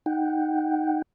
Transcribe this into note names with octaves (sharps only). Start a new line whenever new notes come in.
D#4 F#5 G5